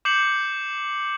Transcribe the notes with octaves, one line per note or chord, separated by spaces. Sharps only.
D6 G6 C7 C#7 F#7